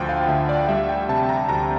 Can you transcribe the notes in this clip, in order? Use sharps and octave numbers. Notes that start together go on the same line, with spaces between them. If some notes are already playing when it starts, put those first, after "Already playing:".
Already playing: D2 D3 F3 G5
F5
D2 E5
D5
G3 E5
G5
C3 A5
A#5
D2 A#5